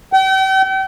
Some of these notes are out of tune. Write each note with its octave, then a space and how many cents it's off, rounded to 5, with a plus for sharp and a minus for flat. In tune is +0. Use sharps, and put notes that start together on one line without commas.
G5 -40